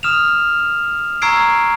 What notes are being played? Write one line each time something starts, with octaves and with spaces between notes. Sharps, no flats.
D#6 F6 E7 F7
A#5 C#6 E6 G#6 C7 D7